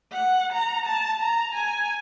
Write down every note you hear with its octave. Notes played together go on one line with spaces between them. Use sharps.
F#5
A#5
A5
A#5
G#5